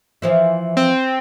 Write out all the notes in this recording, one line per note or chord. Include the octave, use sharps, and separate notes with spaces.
E3 F3 E4
C4